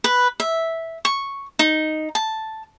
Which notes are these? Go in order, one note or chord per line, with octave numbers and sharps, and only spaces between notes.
B4
E5
C#6
D#4
A5